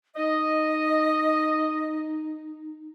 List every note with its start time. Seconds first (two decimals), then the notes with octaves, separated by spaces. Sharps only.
0.16 D#4 D#5